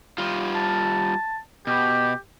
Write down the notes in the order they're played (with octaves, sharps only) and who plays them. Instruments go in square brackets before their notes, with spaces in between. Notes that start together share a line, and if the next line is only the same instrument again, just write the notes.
[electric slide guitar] G3 F4
[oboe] A5
[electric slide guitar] B2 [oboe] G4